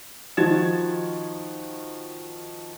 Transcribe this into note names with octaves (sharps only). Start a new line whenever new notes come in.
D#3 F3 F#4 G#6 A6 E7